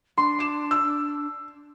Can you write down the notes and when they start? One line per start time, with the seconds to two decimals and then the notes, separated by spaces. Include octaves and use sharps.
0.18 D4 C6
0.39 D6 E7
0.71 E6